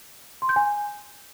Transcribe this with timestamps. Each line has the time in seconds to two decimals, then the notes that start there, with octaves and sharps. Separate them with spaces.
0.42 C6
0.49 G6
0.56 G#5